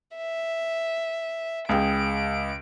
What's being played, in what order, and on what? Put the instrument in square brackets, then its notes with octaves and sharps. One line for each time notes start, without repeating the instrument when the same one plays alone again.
[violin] E5
[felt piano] C#2 G#4 G5 [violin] D7